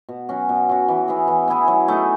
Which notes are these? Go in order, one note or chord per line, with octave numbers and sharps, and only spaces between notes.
B2
F#3 C#4 F#4
B2
F#3 C#4 F#4
E3
B3 E4 G#4
E3
B3 E4 G#4
F#3
A3 D#4 G#4